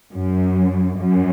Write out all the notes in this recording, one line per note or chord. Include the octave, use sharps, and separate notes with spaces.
F#2
F#2